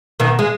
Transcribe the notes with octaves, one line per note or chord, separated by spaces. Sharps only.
B2 D#3
G#3